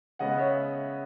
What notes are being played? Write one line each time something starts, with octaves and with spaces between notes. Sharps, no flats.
C#3 G#3 B3 D#5 F#5
C#5 E5